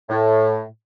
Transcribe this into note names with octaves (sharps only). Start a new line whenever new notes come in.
A2